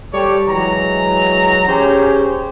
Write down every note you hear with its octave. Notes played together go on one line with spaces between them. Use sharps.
G3 G4 A4 C#5 D5
E3 F#3 G#3 A#5
C#4 G4 G#4 C5 C#5